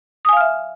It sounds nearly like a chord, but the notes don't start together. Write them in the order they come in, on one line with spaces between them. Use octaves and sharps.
D#6 G#5 F5 F6 E5